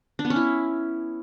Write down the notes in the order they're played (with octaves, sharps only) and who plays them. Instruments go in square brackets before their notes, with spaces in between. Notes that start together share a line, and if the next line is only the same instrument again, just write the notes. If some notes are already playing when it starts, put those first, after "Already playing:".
[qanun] D4
B3
C#4
E4